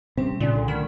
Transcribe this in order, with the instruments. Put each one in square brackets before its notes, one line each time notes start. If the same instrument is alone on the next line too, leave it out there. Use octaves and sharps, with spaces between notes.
[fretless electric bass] C3 C4 [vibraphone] G3 C#4
[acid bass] A#2 [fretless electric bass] C#3 D4
[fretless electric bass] C2 D3
[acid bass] D#3 [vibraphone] A3 B5